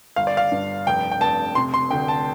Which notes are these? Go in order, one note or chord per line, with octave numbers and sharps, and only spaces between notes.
G1 F5
D5
F5
G2
F1 G5
G5
F1 A5
C3 C6
C6
D2 G5
A5